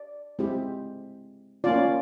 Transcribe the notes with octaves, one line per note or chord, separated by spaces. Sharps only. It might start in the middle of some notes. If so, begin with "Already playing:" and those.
Already playing: D5
G#3 C4 E4 G4
A#3 C#4 F4 D5